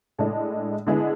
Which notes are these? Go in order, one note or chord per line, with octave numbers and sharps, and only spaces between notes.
A2 G#3 D4 A4
D3 G#3 B3 E4 G#4